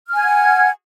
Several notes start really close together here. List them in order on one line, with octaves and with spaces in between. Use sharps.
F6 G#5 G#6 F#5